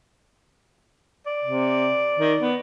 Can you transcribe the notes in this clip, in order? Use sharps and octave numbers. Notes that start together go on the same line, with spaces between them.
D5
C3
D#3
B3